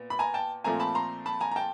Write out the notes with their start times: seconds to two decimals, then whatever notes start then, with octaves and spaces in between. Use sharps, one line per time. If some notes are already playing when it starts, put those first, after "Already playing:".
Already playing: A#2 B3
0.10 B5
0.19 G#5 A#5
0.34 G5 A5
0.64 A#2 F3 A3 C4 G#5 A#5
0.80 A5 B5
0.95 A#5 C6
1.26 A5 B5
1.41 G#5 A#5
1.51 A#5
1.56 G5 A5